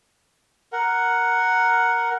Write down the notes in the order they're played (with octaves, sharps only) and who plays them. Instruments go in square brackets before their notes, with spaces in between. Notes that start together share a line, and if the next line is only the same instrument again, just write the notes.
[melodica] A#4 F#5